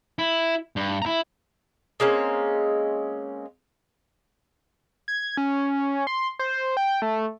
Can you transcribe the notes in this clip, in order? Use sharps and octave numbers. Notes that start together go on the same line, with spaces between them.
E4
G2
E4 A#5
G#3 A#3 C4 C#4
G#6
C#4
C6
C5
G5
A3